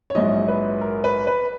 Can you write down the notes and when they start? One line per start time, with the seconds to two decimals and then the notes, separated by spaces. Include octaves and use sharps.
0.10 C#5
0.15 A#1 G#2 F#3 D#5
0.48 B4
0.81 A#4
1.04 B4
1.27 B4